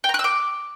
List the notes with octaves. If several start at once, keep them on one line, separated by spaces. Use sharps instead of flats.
G5
A#5
F#6
E6
D6